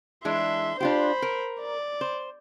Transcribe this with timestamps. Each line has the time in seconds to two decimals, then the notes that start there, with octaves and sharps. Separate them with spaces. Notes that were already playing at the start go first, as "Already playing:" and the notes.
0.25 E3 G#3 D4 E5 C6
0.81 D4 F4 G4 C5 B5
1.22 A#4
1.60 D5
2.01 C5